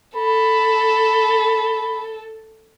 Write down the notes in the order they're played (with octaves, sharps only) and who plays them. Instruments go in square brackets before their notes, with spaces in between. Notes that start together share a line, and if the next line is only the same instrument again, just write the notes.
[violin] A4 [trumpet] B5